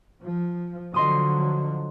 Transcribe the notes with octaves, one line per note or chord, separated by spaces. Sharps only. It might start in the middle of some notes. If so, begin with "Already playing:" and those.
F3
D3 F3 F#3 D#5 C6 D#6